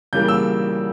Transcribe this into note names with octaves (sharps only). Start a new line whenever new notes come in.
C#3 E3 G3 A#3 G6
E6